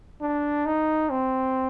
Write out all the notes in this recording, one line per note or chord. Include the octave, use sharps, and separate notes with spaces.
D4
D#4
C4